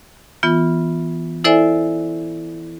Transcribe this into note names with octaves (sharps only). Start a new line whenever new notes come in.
E3 B3 F4
E4 A4 C5 D5 E5 G#5